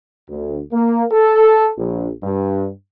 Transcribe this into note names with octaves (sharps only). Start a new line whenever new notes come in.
D2
A#3
A4
A#1
G2